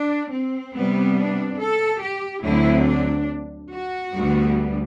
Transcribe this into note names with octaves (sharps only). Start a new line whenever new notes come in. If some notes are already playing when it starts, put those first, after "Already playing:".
Already playing: D4
C4
C3 G3 B3
D4
A4
G4
D2 D3 F#3 C4 E4
D4
F#4
D2 D3 G3 B3